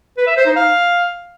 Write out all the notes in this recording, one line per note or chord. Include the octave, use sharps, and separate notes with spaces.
B4
E5
C5
D#4
F5